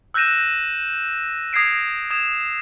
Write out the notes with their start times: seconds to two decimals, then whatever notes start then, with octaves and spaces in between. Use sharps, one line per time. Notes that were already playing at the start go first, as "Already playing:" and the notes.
0.14 E6 F#6 G6 A#6 D#7 E7
1.53 D#6 G#6 A#6 C7 D7
2.10 D#6 G#6 E7